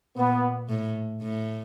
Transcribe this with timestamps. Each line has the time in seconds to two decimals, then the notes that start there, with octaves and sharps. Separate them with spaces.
0.16 A#2 B3
0.69 A2
1.22 A2